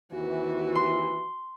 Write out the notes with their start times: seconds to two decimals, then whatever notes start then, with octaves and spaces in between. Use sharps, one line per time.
0.12 D#2 C3 E3 F#4
0.75 C6